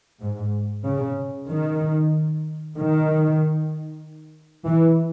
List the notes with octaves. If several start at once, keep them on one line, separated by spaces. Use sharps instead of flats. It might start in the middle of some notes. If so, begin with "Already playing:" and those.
G#2
C#3
D#3
D#3
E3